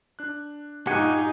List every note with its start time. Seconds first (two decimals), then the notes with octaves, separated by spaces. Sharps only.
0.19 D4 F#6
0.87 G2 A#2 D#4 G4 F#5 G#5